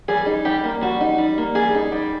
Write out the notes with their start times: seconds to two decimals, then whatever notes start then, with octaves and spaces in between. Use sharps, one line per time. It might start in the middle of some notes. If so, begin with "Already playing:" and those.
0.08 G3 G#4
0.26 D#4
0.45 G3 G4
0.64 A#3
0.81 G3 F#4
1.01 D#4
1.18 G3
1.38 A#3
1.55 G3 G#4
1.75 D#4
1.92 G3